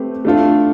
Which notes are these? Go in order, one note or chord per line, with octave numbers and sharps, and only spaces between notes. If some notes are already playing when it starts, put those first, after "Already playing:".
Already playing: A3 C4 G4 B4
A3 D4 F4 A4